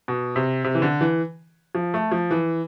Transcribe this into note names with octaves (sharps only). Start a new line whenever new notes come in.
B2
C3
C3
E3
D3
E3
F3
A3
F3
E3